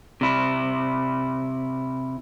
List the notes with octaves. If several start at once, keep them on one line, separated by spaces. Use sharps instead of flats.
C3 E4